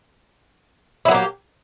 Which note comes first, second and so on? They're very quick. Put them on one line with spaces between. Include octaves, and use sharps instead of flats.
E4 F#3 A#3 G4